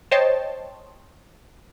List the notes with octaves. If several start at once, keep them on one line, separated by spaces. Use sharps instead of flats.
C5 C#5 D#5 G5 A5 C6